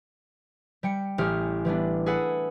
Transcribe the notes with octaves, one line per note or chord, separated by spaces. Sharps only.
G3 G5 C#7
A1 C#4 G4 D#6 F6
E3 G3 B3 D4
G#4 A4 B4 F#5